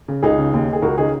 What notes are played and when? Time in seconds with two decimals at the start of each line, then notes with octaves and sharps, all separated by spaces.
0.08 C#3
0.23 C#2 D#4 G#4
0.38 C#3
0.54 D#2
0.68 D#3
0.73 G#4
0.82 C#2 F#4 A#4
0.98 C#3 D#4 G#4